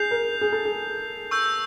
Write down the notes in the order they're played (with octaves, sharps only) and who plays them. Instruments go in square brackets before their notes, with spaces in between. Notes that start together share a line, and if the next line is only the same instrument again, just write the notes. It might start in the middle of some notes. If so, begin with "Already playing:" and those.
Already playing: [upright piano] G#4 [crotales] G6 C7 F7
[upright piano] A#4
G#4
A4
G#4
[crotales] C#6 E6 G6